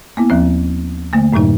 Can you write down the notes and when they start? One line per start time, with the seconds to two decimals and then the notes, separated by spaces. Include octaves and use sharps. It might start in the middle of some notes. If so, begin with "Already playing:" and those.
0.17 A#3 B3 E4
0.30 D#2 F3 C4
1.13 D3 A3 A#3
1.33 F#2 A2 C3 F#3 D#4